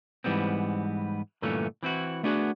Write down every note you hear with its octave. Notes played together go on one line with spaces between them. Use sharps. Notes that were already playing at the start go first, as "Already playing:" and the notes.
G#2 E3 G3 B3 C4
G2 A#2 D3 E3 A3 C#4
E3 C4 E4 F#4
A3 B3 D4 F#4 G#4